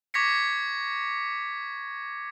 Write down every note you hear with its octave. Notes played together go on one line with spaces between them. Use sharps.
C#6 D6 G#6 A#6 B6 C#7